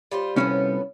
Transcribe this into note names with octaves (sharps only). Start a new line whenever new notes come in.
G3 F4 C5
C2 A2 F3 B3 C#4